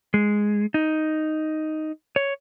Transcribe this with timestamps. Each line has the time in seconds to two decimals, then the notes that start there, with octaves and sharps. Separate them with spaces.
0.14 G#3
0.74 D#4
2.16 C#5